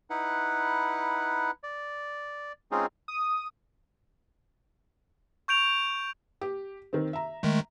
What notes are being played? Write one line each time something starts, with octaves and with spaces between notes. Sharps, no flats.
D#4 E4 B4 F#5
D5
G#3 C4 C#4 D#4 F4 G#4
D#6
C#6 G6 D7 F7
G4
D#3 C4
E5 A#5
D#3 G#3 A3